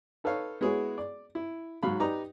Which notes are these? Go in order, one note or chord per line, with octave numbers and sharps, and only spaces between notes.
D#4 A4 B4 C#5 F5
G#3 B3 E4 F#4 G#4 C#5
D5
E4
G#2 F#3 C#5 F5 B5
D#4 G4 B4 D5 A#5